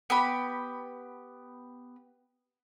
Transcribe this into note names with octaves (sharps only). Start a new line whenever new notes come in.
B3 G4 B5